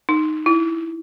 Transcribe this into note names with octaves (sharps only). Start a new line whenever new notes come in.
D#4
E4